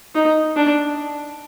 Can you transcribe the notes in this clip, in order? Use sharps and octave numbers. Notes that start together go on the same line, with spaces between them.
D#4
D4